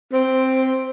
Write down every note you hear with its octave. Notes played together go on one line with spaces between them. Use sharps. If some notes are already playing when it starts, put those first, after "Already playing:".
C4